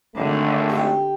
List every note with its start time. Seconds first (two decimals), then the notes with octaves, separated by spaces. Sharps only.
0.16 G#1 D3 A3
0.69 G4